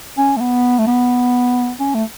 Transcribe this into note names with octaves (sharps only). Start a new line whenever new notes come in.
C#4
A3
B3
A3
B3
C#4
A3